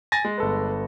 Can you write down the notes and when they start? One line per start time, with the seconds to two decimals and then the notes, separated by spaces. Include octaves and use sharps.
0.12 G#5 A6 A#6
0.25 G#3
0.38 G1 A4 B4